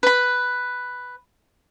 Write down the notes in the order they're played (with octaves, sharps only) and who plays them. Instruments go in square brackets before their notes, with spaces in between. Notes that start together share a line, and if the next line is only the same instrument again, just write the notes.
[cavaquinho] B4 B5